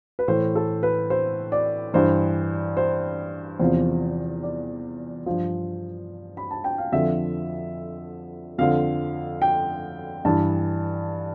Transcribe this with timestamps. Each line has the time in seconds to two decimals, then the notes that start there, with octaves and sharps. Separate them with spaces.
0.19 B4
0.28 A2 E3 C5
0.55 A4
0.83 B4
1.10 C5
1.52 D5
1.94 G2 E3 C5
2.77 C5
3.59 E2 C3 F3 C5
4.43 D5
5.26 G2 F3
6.37 B5
6.51 A5
6.64 G5
6.78 F5
6.92 F2 D3 F3 E5
8.58 F2 D3 F3 F5
9.42 G5
10.25 G2 E3 A5